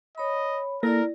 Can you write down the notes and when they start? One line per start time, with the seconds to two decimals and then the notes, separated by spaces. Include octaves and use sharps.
0.18 C#5 D#5 B5
0.83 A#3 E4 A4 A#4 D5 A#6